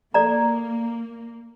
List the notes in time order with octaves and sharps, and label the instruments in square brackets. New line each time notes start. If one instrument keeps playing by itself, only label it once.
[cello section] A#3 [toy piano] A4 D5 A#5